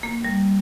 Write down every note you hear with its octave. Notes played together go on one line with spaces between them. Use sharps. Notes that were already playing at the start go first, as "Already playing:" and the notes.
A#3
G3